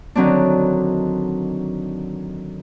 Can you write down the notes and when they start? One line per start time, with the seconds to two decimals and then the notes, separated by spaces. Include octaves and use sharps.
0.15 D3 D#3 F#3 C4 D4